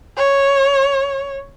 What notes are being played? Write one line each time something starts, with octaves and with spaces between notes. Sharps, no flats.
C#5